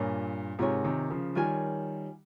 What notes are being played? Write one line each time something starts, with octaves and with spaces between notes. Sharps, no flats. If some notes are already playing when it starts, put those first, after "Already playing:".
Already playing: G2 A#2 F4 A#4 C#5 G#5
G#2 C3 F4 A#4 C#5 G#5
C3 D#3
C#3 F3
D#3 G3 F4 A#4 C#5 G#5